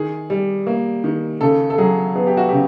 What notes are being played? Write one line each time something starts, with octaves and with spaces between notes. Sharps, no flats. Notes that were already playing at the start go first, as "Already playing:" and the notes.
Already playing: D#3 G#4
G3
A#3
D#3
C#3 A4
A4
F#3 G#4
B3 G#4
G4
F#4
C#3 G4